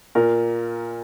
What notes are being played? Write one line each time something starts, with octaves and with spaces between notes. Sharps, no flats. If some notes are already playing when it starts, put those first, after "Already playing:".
A#2 A#4